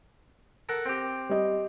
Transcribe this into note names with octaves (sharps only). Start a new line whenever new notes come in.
A4 A#4 F#5
C4 G4
G3 D#5